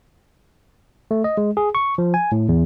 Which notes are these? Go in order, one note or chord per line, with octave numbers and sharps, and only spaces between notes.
A3
D#5
G#3
G#4
C#6
F3
G#5
A2
E2